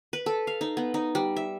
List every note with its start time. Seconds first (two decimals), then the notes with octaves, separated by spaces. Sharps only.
0.13 B4
0.26 A4
0.47 F5
0.61 D#4
0.77 B3
0.94 D#4
1.15 G3
1.36 E5